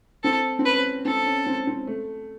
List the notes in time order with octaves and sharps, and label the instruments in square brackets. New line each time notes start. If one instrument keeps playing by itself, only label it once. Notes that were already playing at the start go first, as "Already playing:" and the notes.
[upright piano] C4 [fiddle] A4
[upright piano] C4
[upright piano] C#4 [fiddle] B4
[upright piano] C4 [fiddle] A4
[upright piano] C#4
C4
C4
A3